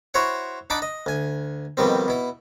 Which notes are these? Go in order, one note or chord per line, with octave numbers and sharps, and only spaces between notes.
E4 F#4 C5 C#5 F#5
D4 D#4 F#5 A5 B5 D6
D#5
D2 G#5
F2 B2 D#3 G3 C4
B2 E4